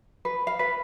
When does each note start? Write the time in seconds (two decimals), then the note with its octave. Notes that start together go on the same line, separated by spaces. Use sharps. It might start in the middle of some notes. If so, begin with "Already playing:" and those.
0.25 B4
0.47 F5
0.59 B4